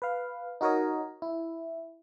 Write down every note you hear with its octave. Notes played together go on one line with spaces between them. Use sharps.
B4 F5
D#4 F#4 A#4 C#5 D#5
E4